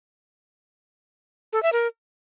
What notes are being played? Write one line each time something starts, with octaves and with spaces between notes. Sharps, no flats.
A4
E5
A#4